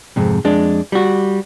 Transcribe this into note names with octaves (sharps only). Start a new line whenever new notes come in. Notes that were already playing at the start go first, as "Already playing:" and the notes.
F2 G#2 C3
F2 G#3 D4
G3 F#4